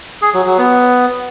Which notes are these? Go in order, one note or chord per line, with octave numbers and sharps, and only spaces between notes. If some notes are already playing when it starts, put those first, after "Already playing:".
G#4
F#3
F#3
B3